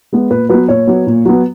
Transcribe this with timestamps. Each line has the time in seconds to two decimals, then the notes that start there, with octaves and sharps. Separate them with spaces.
0.13 G#3 B3
0.30 A#2 B4
0.49 F#3 B3 B4
0.68 A#2 C#5
0.87 F#3 B3
1.06 A#2
1.25 F#3 B3